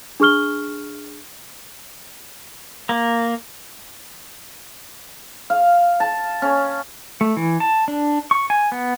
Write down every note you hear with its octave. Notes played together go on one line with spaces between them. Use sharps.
D4 G#4 C#6 F6 G7
A#3
F5
A5
C#4
A3
E3
A5
D4
C#6
G#5
B3